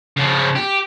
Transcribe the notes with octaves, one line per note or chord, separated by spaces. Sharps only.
C#3 F3
G4